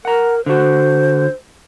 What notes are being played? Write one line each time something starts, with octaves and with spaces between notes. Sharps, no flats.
A#4 F#5 A#5
D3 F#4 C5